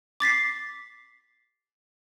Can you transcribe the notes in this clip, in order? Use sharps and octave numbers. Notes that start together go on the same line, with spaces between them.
D6 A6 B6 C7